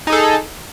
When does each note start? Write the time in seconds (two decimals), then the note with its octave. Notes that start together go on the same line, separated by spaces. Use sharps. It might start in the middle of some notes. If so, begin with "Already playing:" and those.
0.07 D#4
0.10 G#4
0.12 A4